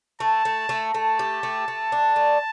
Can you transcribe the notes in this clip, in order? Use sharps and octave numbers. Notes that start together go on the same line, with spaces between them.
A3 A5
A3
A3
A3 A5
G4
A3
A3
D4
A3